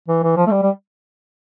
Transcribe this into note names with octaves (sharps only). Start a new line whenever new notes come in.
E3
E3
F3
A3
G3
G3